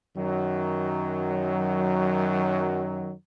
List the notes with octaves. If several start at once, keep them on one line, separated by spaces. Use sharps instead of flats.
F#2 D#3 F#3